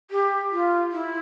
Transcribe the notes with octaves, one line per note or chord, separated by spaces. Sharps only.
G4
F4
E4